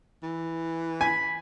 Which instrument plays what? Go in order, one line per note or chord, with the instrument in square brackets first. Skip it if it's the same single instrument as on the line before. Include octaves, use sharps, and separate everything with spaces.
[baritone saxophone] E3
[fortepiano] G#5 [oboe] B5